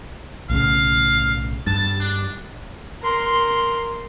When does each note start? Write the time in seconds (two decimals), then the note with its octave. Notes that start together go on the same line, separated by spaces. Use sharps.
0.50 B1 A2 C#3 F5
1.67 G2 A5
2.00 D4
3.03 A#4 C6